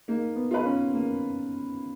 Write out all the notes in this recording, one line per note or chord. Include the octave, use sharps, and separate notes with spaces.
A#3 D#4
B3
F4 B4
C#4
A#3